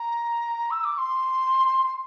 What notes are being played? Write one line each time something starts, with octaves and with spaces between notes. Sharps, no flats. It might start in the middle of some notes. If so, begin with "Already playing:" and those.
Already playing: A#5
E6
D6
C6